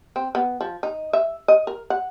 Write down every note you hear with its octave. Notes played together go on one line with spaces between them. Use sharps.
C4
B3
F3
D#4
E5
D#5
A#4
F#5